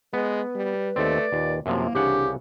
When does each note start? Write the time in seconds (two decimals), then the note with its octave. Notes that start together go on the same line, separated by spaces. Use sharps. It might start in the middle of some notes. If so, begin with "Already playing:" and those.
0.13 G#3 B3 B4
0.55 G3
0.96 D#2 A3 C4 D5
1.32 D#2 A#2
1.66 F#2 C3 E3 F3 A#3
1.95 C2 C#3 D4 G4 F#5